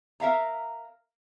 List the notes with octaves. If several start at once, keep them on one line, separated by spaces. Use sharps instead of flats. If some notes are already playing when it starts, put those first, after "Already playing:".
A#4 E5 F5 A#5